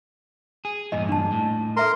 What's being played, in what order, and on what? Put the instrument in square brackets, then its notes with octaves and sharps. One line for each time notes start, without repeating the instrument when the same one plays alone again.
[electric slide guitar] G#4
[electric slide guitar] E2 G2 A#2 [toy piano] D#5
[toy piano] D4 A5
[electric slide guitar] A2
[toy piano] A4 E5 A#5 [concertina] A#4 C6